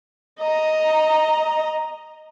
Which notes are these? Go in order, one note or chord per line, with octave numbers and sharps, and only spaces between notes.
D#5 A#5